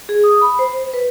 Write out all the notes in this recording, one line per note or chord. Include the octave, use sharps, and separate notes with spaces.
G#4
D#6
B5
C5
B4